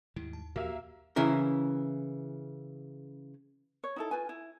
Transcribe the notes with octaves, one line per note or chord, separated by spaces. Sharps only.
D#2 G#2 D#3 G3 E4
A5
E2 A#2 F3 A#3 F#4 G4 E5 F5
C#3 E3 E4 A#4
C#5
D#4 E4 A4
F4 B4 G#5
E4